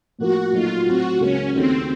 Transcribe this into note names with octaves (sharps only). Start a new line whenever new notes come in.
A2 F3 A#3 F4 F#4
A#2 F#3 A3 D#4 F4
A2 F#3 C4 F#4
C#2 C#3 F#3 A#3 C#4
D#2 C#3 A3 C4 D#4 F#4